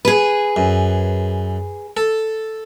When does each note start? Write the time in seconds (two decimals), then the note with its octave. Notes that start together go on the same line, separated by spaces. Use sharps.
0.05 G#4 B4
0.56 F#2
1.97 A4